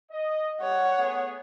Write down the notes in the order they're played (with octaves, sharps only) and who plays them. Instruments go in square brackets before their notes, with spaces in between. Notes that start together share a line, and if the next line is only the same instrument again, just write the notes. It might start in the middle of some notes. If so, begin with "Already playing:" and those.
[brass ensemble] D#5
[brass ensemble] G3 [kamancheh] C#5 F#5
[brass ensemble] A3 B3 G#4